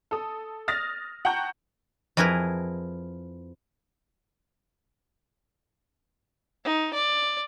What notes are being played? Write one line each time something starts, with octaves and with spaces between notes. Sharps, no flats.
A4 D#6
D#6 F6 A6 A#6
F#5 G5 A5 A#5 C#6 G6
F2 E4 G#4 A#4 B4 A#5
D#4
D5